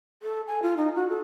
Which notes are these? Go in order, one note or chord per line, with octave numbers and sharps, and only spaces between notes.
A4
G#5
F4
D#4
F#4
A4